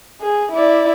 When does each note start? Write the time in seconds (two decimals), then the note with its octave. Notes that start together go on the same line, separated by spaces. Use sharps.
0.21 G#4
0.52 E4 D5